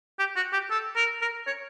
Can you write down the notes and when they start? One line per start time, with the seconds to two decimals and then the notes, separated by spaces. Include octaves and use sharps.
0.19 G4
0.36 F#4
0.53 G4
0.71 A4
0.96 A#4
1.22 A#4
1.47 C#5